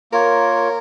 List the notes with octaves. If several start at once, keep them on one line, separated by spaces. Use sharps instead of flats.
A#3 F4 A#4 C#5